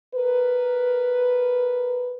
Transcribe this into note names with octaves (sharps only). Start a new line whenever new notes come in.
A#4 B4